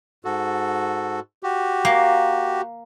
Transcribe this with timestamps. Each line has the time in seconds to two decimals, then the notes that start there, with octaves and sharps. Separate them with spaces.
0.25 G#2 F#4 A4
1.43 F#4 G4
1.85 A#3